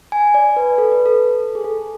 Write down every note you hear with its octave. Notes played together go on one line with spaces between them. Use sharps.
G#5
D5
B4
A4
B4
A4
G#4
A4